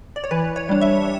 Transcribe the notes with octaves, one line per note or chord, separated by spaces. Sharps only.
D5
C#5
E3 B4
C#5
G3 D4
E5